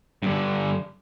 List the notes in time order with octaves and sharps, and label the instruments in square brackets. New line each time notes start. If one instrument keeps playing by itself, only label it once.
[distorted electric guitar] G2 D3